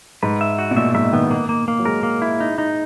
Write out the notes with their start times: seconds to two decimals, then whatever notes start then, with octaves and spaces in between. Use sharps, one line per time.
0.23 G#2 B4
0.41 E5
0.59 F#4
0.71 B2
0.77 A#2 E5
0.94 G#2 E5
1.13 D#3 B3
1.31 A#3
1.49 A#3
1.68 A#3
1.79 F#3
1.85 G#3 A#4
2.03 A#3
2.22 E4
2.40 D#4
2.58 D#4